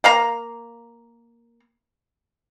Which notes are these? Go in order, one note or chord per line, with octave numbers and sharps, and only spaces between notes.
A#3 F5 A#5